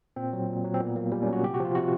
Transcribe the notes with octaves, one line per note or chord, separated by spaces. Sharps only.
A#2 C4
F#3
A#2
F#3
C4
A#2 B3
F#3 A#3
A#2 G3
C#4
F#3 F#4
C3 G4
F#4
F3 F4
C3 F#4